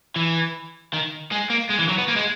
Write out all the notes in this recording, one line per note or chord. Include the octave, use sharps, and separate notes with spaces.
E3
D#3
G#3
A#3
G#3
E3
F#3
B3
A#3
G#3